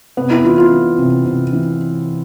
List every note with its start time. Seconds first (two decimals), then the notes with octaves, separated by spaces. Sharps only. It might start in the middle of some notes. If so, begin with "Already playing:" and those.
0.17 C3 B3
0.31 E4
0.44 E3 F4
0.58 F4
0.72 E3
0.98 C3
1.26 C3
1.53 E3